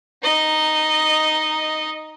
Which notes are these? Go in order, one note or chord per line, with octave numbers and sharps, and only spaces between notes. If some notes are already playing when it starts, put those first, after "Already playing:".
D#4 D#5